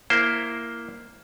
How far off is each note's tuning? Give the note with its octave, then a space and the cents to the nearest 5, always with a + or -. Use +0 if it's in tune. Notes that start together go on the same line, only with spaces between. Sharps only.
A#3 +0 E4 +15 C5 +0